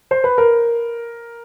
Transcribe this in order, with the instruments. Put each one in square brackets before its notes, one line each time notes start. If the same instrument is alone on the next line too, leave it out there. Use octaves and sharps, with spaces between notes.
[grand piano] C5
B4
A#4